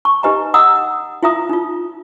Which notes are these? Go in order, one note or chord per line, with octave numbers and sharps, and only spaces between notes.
A5 C#6
D#4 G4 B4 D#5 G#5 A#5
D#5 F#5 A#5 D#6 E6
E4 F4 E5 A#5 D#6
D#4 F4